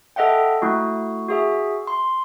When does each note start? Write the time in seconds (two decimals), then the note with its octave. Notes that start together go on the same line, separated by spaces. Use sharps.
0.16 A4 D#5 E5 F#5 G5
0.62 A3 E4 F#4
1.29 F#4 G#4 E5
1.87 C6